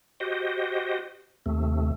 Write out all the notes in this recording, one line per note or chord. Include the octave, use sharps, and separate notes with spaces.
F#4 G4 C5 D#5
D#2 C3 A3